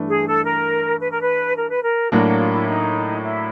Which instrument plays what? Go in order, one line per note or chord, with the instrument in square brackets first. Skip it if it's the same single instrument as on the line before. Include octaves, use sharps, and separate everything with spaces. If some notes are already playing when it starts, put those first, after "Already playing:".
Already playing: [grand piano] G2 E3 A3 D4
[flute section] G#4
A4
A#4
B4
A#4
B4
A#4
B4
A#4
[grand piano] A2 F#3 A#3 D4 [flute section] F#4
[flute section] F#4
F4
E4
D#4
E4